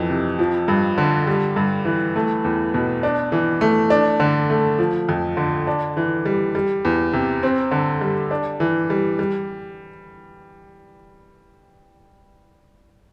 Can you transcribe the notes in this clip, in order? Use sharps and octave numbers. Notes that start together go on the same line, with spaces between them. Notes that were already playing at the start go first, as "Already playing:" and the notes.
Already playing: F2 E3 F3
C3
F3
G2
D3
G3
G2
E3
A3
E2
B2
D4
E3
A3
D4
D3
A3
F3
F2
D3
D4
E3
G3
G3
E2
C3
C4
D3
G3
D4
E3
G3
G3